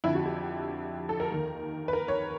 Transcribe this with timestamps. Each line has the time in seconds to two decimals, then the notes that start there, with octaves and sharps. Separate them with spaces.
0.04 F2 D3 E4
0.15 F#4
0.26 G4
1.09 A4
1.20 A#4
1.31 D#2 D#3
1.88 B4
1.93 A#4
2.08 C#5